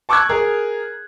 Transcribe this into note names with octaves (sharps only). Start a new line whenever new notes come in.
A5 C#6 D6 E6 F#6 G#6
G#4 A#4